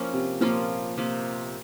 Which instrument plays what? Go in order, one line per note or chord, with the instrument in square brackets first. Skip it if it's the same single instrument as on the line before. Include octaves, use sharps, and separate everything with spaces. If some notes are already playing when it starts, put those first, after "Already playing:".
Already playing: [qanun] F3 A#3 C#4 F4
[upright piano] C3
[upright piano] A#2 [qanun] F3 A#3 C#4 F4
[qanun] C3 F3 A#3